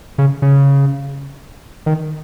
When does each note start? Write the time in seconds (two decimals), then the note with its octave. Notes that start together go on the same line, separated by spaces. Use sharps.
0.18 C#3
0.42 C#3
1.86 D#3